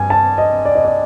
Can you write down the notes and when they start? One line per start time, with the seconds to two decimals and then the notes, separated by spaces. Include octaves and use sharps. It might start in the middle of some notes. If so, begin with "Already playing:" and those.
Already playing: G2 G3 G#5
0.10 A5
0.38 D#5
0.65 D5
0.75 D#5
0.85 D5